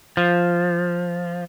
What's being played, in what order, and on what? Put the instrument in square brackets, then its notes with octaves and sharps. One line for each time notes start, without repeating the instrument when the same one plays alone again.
[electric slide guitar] F3